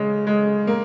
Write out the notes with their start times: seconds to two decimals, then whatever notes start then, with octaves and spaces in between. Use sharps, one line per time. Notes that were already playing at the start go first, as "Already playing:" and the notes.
Already playing: C#3 G#3
0.27 G#3
0.67 A#3